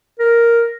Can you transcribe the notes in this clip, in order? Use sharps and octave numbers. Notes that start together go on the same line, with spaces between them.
A#4